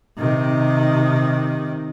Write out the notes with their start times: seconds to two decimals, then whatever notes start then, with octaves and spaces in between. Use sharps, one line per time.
0.17 C3 D#3